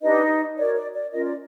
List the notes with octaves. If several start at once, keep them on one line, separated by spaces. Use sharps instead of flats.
D4 D#4 G4 B4 D#5
F#4 A#4 C#5 D5
D5
D5
C#4 F4 A#4 C#5 D#5
D5